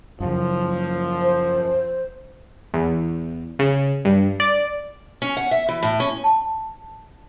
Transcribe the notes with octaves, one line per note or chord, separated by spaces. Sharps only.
F#2 C#3 F3
C5
E2
C#3
G2
D5
C#4
F#5
E5
E3
A2
C#4
A5